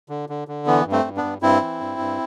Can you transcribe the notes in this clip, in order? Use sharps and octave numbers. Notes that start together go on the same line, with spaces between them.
D3
D3
D3
E3 B3
G2
A3 C4
G2
B3 D4
G2
G2 C4 E4
E3
G2
G2